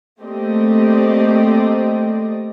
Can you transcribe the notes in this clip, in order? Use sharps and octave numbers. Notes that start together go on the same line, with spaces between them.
A3 A#3 C4 G4 D5 D#5